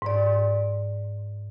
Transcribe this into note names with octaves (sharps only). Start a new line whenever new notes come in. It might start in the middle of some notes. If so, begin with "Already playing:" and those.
G#2 D5